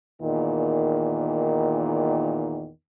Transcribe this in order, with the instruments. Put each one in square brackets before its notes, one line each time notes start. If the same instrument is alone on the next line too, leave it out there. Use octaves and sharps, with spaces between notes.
[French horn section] E2 A#2 D#3